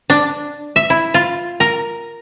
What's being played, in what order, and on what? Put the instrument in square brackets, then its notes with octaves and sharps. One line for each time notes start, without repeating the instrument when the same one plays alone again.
[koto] D4
E5
E4
F4
A#4